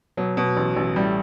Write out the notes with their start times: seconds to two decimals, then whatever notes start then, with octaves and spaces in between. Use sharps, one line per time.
0.17 B2 F#3
0.37 B2
0.57 A1
0.77 A1
0.96 A2 G3